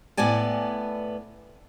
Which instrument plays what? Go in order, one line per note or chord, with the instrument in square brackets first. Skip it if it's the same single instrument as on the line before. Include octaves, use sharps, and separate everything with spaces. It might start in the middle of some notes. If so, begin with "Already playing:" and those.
[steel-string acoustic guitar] A2 B3 D5 G#5 A5